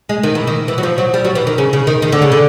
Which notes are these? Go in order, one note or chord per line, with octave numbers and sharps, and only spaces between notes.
G#3
D#3
E3
D#3
E3
F#3
F3
F#3
G3
F#3
E3
D#3
C#3
C#3
D#3
D#3
D3
C#3
D3